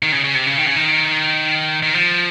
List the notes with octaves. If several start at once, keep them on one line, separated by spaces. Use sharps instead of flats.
D#3
C#3
C#3
C3
C#3
D#3
C#3
D#3
D#3
F3